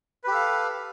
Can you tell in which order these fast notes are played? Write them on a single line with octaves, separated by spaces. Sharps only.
B4 G4 A4 F5